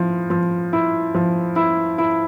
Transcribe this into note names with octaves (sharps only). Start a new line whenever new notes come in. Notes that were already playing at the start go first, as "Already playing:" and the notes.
Already playing: F3 E4
F3
E4
F3
E4
E4